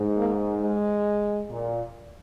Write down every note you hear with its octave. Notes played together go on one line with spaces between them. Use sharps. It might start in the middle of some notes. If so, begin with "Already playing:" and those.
Already playing: G#2
A#3
G#3
A#2